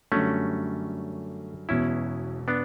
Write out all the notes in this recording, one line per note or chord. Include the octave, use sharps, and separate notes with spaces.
F#2 D3 G3 A3 C#4 D4 F#4
E1 E2 B2 C#4 E4
B3 D4